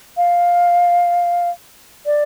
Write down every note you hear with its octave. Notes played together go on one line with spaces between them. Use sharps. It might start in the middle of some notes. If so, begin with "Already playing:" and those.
F5
D5